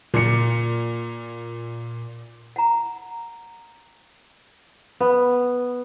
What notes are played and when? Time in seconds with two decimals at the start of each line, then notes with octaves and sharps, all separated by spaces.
0.14 A#2 C#7
2.56 F#5 A#5
5.00 B3